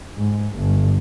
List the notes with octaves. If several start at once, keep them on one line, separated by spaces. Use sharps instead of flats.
G#2
G1